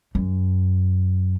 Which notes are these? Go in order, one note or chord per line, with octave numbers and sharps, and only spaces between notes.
F#2